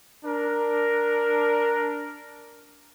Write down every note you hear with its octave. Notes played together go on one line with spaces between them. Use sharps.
D4 A#4